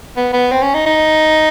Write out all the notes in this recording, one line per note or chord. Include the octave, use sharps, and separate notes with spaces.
B3
B3
C4
C#4
D#4
D#4